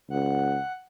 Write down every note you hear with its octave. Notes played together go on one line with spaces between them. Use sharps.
C#2 F#5